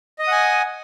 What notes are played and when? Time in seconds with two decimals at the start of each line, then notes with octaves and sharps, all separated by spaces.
0.19 D#5
0.23 D#6
0.27 F#5
0.32 G#5